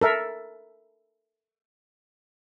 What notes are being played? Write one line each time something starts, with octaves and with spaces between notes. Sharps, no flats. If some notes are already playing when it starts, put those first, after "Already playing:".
A4 A#4 E5